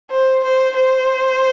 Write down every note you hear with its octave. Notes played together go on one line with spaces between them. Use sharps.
C5
C5
C5